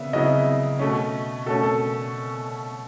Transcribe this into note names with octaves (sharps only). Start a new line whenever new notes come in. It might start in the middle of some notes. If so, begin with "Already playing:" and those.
Already playing: C#3 B3 E5
C#3 F#3 B3 E4 D#5
B2 A3 C#4
B2 A3 C#4 A4
A4